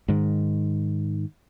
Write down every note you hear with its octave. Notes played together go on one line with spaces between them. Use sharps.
G#2 D#3